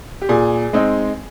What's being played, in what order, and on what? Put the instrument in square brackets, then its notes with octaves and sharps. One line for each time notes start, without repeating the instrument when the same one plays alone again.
[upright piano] G4
A#2 G#4
G#3 C4 D#4